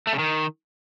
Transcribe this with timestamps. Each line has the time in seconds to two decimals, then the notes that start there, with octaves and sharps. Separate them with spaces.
0.07 A3
0.13 C#3
0.19 D#3